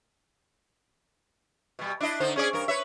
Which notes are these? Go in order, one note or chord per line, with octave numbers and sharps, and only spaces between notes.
B2 G3
D4 E4 D#5
D3 D#4 C5
C#4 G#4 D5
G2 A#4
B4 C#5 E5